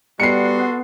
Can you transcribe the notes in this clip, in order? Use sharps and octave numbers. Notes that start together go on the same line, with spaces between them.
G3 B3 F#4 A4 C6 C7 C#7